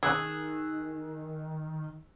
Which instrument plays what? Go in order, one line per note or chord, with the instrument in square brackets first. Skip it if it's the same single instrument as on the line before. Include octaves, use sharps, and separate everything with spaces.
[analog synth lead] D#3 [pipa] G#4 [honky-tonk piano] E6 F#6